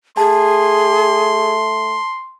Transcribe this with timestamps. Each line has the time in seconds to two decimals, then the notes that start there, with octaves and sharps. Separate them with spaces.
0.17 A3 G#4 A5 C6